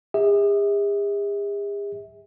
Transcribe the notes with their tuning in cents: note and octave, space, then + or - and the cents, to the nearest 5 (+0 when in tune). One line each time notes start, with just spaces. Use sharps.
G#4 -45 E5 -35